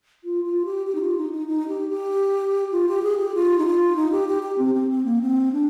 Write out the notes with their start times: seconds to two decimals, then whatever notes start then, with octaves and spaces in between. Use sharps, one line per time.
0.24 F4
0.44 F4
0.65 G4
0.86 G4
0.95 D#4
1.01 F4
1.17 D#4
1.33 D#4
1.48 D#4
1.68 G4
1.90 G4
2.72 F4
2.89 G4
3.03 G#4
3.19 G4
3.35 F4
3.58 D#4
3.66 F4
3.96 D#4
4.12 G4
4.28 G4
4.43 G4
4.58 C4
4.74 C4
4.91 C4
5.05 A#3
5.21 C4
5.53 D4